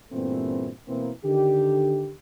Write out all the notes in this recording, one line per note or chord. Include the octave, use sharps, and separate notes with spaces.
G2 A#2 E3 A3 B3 C4
B2 E3 A#3 C4
D3 D#3 G4